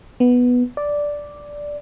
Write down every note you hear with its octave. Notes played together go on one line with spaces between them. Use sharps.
B3
D5